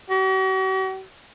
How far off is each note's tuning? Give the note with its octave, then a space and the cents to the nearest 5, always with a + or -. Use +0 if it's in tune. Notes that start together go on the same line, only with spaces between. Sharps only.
F#4 +45